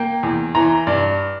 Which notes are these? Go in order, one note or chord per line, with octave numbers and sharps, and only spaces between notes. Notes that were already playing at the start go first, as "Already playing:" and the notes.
Already playing: A#3 G5
E2
E3 A#5
G2 D5